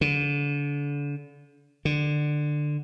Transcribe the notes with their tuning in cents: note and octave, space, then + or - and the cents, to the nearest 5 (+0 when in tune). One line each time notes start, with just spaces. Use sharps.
D3 -35
D3 +15